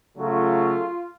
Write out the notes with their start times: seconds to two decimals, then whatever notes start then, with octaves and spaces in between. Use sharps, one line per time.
0.17 C#3 F#3 A3 F4